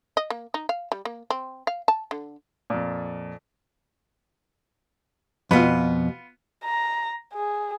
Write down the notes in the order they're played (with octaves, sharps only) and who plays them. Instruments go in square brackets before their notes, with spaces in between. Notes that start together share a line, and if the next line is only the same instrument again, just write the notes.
[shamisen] D#5
A#3
D#4
F5
G3
A#3
C4
F5
A5
D3
[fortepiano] F2 A#2
[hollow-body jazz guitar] F2 B2 [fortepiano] B3 F4
[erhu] A#5
G#4